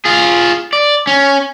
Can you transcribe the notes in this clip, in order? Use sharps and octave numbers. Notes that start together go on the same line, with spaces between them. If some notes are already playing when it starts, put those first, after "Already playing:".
F4 G#4
D5
C#4